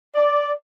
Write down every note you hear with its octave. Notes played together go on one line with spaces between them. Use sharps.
D5